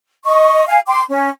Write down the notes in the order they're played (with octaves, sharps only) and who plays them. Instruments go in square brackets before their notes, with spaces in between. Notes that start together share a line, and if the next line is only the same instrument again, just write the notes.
[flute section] D#5 C#6
F5 G#5
G5 C6 D6
C#4